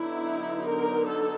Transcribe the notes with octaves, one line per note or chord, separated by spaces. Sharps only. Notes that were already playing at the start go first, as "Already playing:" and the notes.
Already playing: D3 F#3 B3 D#4 E4
A#4
A4